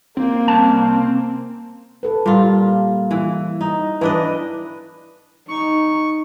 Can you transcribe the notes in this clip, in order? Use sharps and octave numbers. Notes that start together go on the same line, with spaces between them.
A#3 C4
C2 C#4 A5
A4 B4
A#2 G3 F4
E3
D#4
E3 D4 B4 D#5
D#4 C#6